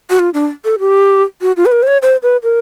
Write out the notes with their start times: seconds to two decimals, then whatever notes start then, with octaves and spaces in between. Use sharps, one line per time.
0.10 F#4
0.19 F4
0.34 D4
0.65 A4
0.79 G4
1.41 F#4
1.57 F4
1.66 B4
1.72 A#4
1.83 C5
1.87 C#5
2.02 C5
2.23 B4
2.43 A#4